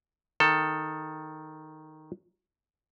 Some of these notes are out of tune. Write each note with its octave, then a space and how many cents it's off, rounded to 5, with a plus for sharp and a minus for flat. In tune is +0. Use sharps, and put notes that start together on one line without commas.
D#3 +0 A4 +10